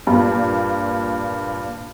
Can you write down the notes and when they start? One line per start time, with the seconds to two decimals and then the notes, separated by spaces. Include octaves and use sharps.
0.07 G2 A#2